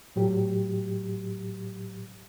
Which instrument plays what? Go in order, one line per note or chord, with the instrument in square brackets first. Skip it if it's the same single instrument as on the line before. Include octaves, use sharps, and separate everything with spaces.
[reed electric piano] A2 F#3 G4